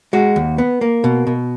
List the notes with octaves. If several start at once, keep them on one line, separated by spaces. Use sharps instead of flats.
G#3 F#4
D#2
B3
A#3
B2
B2